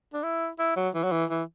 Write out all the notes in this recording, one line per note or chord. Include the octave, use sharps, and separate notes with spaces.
D4
E4
E4
F#3
E3
F#3
E3
E3